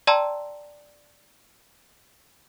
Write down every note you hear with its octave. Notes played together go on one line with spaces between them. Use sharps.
D5 G5 A5 A#5 C6 E6